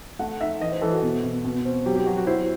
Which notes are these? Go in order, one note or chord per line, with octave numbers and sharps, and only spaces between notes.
A3 F#5
D#4 E5
E3 D#5
C5
E3 A4
F#4
B2
B2
B2
C4
F#3 G4
G4
F#3 F#4
F#4
E4 C5